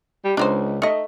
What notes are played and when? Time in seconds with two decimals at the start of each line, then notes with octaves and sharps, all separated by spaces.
0.25 G3
0.37 C#2 D4 D#4 C5
0.82 A3 D#4 D#5